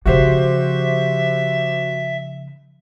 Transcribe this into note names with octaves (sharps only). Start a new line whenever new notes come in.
C#3 F3 F#4 G4 C5 E5